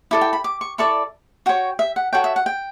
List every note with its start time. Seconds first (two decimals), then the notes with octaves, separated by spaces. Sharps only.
0.11 E4 A4 D5 D6
0.21 G5
0.33 B5
0.44 D6
0.61 C#6
0.78 E4 A4 D5 C#6
1.46 F#4 C#5 G5
1.79 E5
1.96 F#5
2.13 F#4 A4 C#5 G5
2.24 E5
2.36 F#5
2.46 G5